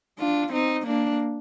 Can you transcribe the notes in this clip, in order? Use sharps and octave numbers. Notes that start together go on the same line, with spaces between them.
D4 F4
C4 D#4
A#3 D4